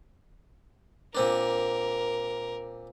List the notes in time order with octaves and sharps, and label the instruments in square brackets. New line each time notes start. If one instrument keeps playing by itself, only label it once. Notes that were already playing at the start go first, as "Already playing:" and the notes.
[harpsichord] A#2 C4 D4 [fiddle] A#4